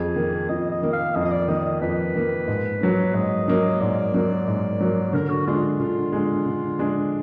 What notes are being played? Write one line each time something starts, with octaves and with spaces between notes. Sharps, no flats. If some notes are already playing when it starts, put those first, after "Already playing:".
Already playing: F2 G#4
D#3 A#3
F2 D#5
D#5
D#3 A#3
F5
F2 D#5
D#5
D5
D#3 A#3 D#5
D#5
F2 B4
D#3 A#3
G#2
F#3 A#3
G#2 D#5
F#3 A#3
G#2 D5
F#3 A#3
G#2
F#3 A#3
D3 A#4
F#4
G#3 D4 F4
D3 F4
G#3 D4
D3
G#3 D4